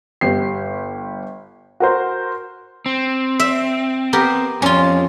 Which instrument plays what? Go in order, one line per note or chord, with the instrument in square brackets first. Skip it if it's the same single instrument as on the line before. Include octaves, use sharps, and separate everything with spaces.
[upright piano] G1 G4 C7
F#4 A#4 C5
[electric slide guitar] C4
[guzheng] E5
B3 G4 A#4
[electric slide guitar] F2 [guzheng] C#4 F4